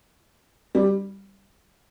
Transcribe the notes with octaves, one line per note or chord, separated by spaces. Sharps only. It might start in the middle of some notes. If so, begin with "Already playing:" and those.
G3